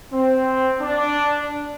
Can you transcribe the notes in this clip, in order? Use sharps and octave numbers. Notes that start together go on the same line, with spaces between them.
C4
D4